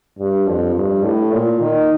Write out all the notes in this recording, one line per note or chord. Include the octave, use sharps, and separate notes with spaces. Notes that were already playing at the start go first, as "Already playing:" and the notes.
G2
F2
G2
A2
A#2
D#3